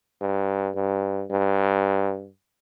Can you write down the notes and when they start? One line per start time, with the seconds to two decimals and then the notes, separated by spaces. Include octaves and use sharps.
0.21 G2
0.75 G2
1.31 G2